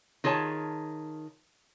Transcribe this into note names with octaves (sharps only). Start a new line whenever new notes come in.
D#3 F4 G#4 C#5 A5